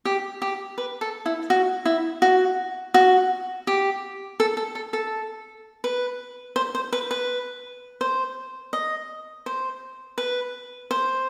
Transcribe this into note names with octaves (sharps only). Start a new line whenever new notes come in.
G4
G4
B4
A4
E4
F#4
E4
F#4
F#4
G4
A4
A4
A4
A4
B4
C5
C5
B4
B4
C5
D#5
C5
B4
C5